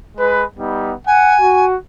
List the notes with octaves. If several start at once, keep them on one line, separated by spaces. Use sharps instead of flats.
G#3 B4
G3 B3 D#4
F#5 G#5
F#4